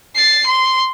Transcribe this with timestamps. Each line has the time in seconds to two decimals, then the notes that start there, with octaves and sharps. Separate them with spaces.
0.15 A6 C7
0.47 C6